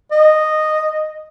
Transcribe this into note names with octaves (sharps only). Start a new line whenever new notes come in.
D#5